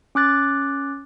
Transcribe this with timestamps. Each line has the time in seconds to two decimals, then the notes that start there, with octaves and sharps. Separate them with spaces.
0.15 C#4 D6 F#6 A6